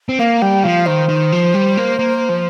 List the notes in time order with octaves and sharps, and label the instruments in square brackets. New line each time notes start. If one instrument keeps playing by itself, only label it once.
[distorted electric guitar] C4
[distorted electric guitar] A#3 [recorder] F5
[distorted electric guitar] G3 [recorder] G5
[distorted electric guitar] F3 [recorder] F5
[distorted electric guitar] D#3 [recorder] C5
[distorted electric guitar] D#3
F3
G3
A#3
A#3
F3